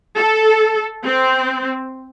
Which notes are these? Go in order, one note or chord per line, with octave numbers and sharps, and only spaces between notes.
A4
C4